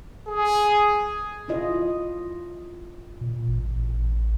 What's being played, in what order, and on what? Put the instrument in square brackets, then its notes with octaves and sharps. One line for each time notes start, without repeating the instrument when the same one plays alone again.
[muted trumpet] G#4
[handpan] E4 F4 D#5
[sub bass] A#2
A1